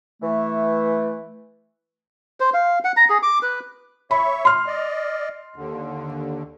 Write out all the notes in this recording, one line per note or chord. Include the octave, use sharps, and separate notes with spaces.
E3 A3
C5
F5
F#5
A#5
G#4
D6
B4
C#5 E5 B5 C#6
C6 F6
D5 D#5
D#2 D3